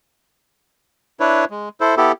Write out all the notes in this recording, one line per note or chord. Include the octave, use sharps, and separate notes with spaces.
D4 E4 B4 C#5
G#3
E4 A4 C5
B3 E4 G4 A4